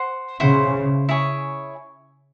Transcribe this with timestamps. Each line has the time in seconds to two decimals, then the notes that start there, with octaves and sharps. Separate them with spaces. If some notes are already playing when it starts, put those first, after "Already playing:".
Already playing: C5 F#5 C6
0.40 C#3 E4 C5 F#5 C6
1.09 E4 G#4 C#5